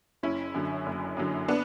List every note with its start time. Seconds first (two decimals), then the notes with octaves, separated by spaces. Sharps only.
0.23 F#1 C#4 E4
0.54 F#2 D3 F#3
0.86 F#1
1.17 F#2 D3 F#3
1.48 B3 D4